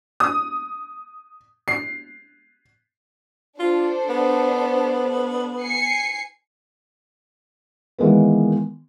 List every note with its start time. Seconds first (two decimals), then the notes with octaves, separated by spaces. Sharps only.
0.20 D#6
1.68 C7
3.60 D4 F4 A4 C5
4.09 B3
5.61 G#5 C7 C#7
7.98 D#3 E3 G#3 A#3 B3